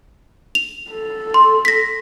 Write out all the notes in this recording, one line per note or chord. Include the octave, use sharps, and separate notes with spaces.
F7
A4
C6
A#6 B6